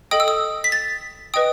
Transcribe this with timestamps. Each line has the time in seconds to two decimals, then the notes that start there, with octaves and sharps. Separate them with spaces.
0.11 A4 D#5 G5 D#6
0.20 E6
0.28 D#6
0.64 B6
0.72 A6
1.34 B4 D#5 G5 D#6